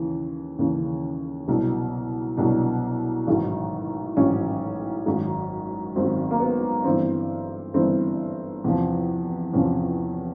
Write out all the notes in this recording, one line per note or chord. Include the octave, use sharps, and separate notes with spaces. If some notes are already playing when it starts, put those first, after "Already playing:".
Already playing: D#2 C#3 E3
D#2 C#3 E3
C2 B2 F#3
C2 B2 F#3 D4
A1 G#2 D#3 F#3
A1 G#2 D#3 F#3 C#4
G#1 F#2 D#3 F#3
G#1 F#2 D#3 F#3 C4
A#3
B3
G1 G2 E3 C4
G1 G2 E3 C4
E2 C3 F3
E2 C3 F3 C#4